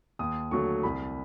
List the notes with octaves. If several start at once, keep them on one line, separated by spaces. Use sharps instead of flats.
D#2 D#6
D3 F#3 A3 C#6
C2 B5